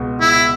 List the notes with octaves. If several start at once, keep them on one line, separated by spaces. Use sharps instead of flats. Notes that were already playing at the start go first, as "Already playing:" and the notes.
Already playing: C#2 B2
C#2 E4